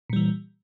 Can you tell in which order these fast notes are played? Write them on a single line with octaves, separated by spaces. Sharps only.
A#2 G3 E3